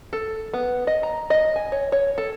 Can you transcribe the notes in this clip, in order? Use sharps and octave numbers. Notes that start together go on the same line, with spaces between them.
A4
B3
D#5
A#5
D#5
G#5
C#5
C#5
A4